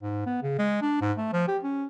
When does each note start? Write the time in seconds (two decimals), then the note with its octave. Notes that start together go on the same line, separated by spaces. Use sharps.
0.02 G#2
0.26 B3
0.43 C#3
0.58 G#3
0.82 D4
1.01 G#2
1.17 A3
1.33 F3
1.48 G4
1.63 C#4